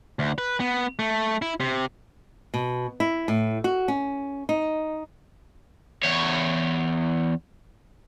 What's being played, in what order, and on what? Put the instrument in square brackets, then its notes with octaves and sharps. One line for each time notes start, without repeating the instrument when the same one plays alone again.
[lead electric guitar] D2
B4
B3
A3
E4
C3
[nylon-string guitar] B2
E4
A2
F#4
C#4
D#4
[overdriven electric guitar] E2 C#5